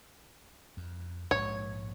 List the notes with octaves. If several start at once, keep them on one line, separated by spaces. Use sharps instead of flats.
F2
A#1 G#2 G#3 C#5